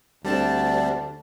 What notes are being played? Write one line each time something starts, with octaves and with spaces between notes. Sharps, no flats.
D2 G3 C4 D4 A5